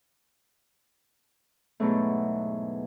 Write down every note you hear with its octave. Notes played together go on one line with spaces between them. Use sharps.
E2 G#2 B2 F#3 A3